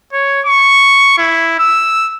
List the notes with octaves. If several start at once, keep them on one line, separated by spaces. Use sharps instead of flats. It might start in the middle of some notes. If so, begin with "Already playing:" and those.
C#5
C#6
E4
E6